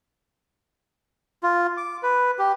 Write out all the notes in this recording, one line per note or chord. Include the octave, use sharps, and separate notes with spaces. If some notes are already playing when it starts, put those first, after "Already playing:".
F4
D6
B4
G4